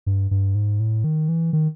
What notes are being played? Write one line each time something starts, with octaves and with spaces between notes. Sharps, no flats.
G2
G2
G#2
A2
D#3
E3
D#3